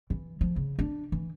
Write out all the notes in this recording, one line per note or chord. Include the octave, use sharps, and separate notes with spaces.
E3
F3
C#3
D4
E3